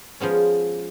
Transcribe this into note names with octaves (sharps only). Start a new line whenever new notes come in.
F3 G#3 B3 C#4